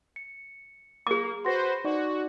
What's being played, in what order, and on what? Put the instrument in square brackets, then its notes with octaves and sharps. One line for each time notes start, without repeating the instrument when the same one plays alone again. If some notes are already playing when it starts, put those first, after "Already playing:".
[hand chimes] C#7
[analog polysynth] A#3 [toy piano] G#4 D6
[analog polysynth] F#4 B4 C5 [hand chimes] C6 A#6
[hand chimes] D#4 D5 [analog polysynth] F#4